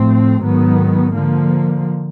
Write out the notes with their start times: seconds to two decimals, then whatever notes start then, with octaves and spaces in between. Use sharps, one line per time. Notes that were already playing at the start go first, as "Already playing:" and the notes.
Already playing: A2 F3 A3 C4
0.41 G#2 D#3 F#3 B3
1.13 D3 F3 A#3